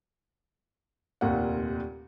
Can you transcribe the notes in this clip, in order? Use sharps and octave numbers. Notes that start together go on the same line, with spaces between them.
F1 D#2 A#2 F5 F#5